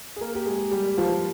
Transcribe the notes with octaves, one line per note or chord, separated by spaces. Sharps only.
G#4
A#3 A#4
G4
G#3 G#4
G3 G4
F3 F4